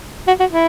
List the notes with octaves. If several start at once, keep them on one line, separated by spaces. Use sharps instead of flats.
F#4
F#4
E4